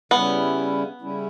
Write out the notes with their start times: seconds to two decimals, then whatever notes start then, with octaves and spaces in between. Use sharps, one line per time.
0.11 C#3 G3 B3 C#4 E4
1.01 C#3 G3 C#4 E4